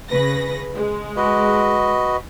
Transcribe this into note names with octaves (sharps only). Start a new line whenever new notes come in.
C#3 B4 A#6
G#3
F#4 B4 D#5